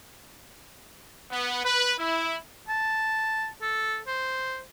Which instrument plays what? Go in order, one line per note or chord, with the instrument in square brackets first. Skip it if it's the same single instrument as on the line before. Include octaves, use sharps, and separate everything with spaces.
[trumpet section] B3
B4
E4
[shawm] A5
A4
C5